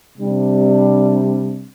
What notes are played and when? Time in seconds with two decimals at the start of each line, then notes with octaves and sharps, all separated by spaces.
0.18 C3 G3 D4